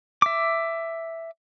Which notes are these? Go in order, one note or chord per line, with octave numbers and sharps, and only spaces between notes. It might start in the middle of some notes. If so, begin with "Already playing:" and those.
E5 D6